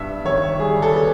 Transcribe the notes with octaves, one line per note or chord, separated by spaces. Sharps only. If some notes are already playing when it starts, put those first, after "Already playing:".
Already playing: G2 G3 B3 E5
D#3 C#5
G3 G#4
A4
B3